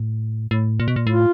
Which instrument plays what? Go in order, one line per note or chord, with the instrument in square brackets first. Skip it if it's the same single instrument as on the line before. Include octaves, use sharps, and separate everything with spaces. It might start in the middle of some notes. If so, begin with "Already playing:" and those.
Already playing: [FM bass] A2
A2
A#2
B2
A#2
[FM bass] A2 [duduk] F4